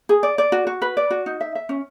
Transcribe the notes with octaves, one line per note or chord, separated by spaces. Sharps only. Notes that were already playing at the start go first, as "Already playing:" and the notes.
G#4
D5
D5
F#4
F#4
B4
D5
F#4
D#4
E5
E5
C#4